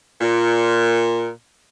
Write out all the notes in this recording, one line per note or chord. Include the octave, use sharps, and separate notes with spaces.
A#2